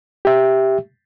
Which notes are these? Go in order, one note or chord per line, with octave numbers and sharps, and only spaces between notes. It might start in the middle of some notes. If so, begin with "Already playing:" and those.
G4 E5